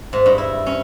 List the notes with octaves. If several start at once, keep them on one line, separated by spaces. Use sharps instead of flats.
G#2
G2
E4
C#4